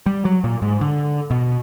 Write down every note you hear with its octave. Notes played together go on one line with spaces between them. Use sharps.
G3
F#3
A#2
G#2
D3
B2